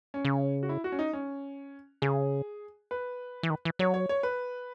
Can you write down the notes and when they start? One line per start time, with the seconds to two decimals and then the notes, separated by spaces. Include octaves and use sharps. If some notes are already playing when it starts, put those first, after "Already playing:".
0.14 C#4
0.25 C#3
0.63 F#4
0.69 E4
0.84 F#4
0.92 C#4
0.99 D#4
1.13 C#4
2.02 C#3 G#4
2.91 B4
3.43 E3
3.50 D#3
3.65 E3
3.79 F#3 C#5
3.94 C#5
4.09 C#5
4.23 B4